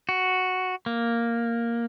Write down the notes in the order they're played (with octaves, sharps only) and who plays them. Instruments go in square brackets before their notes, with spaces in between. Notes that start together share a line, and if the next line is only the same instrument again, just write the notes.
[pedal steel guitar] F#4
A#3